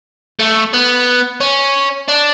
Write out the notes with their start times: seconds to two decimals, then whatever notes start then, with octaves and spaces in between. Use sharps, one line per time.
0.39 A3
0.73 B3
1.41 C#4
2.08 D4